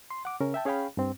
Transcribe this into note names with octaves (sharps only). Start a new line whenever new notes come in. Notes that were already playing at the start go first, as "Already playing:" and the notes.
C6
F#5 D6
C#3 C#4 A#4
E5 G5 A5
C#4 G#4 C#5 F5 G5 B5
G2 C4